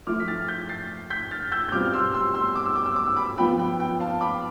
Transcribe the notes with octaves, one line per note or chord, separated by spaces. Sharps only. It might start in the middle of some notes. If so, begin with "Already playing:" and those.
F3 A3 E4 D6 F6
B6
F6 A6
G6 B6
A6 C7
G6 B6
F6 A6
E6 G6
G6
B2 G3 C4 F4 D6 F6
F6
C6 E6
C6 E6
C6 E6
D6
E6
D6
E6
D6
E6
B5 D6
F3 B3 F4 G5 B5
G5
G5
F5 A5
B5 D6